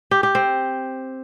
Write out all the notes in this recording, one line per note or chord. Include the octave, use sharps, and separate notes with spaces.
G4
G4
C4